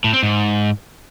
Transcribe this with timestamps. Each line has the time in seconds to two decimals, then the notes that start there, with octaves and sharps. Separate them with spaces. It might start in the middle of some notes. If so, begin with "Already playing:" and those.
0.04 A2
0.14 C4
0.23 G#2